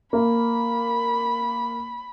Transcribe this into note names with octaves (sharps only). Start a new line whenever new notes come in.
A#3 B5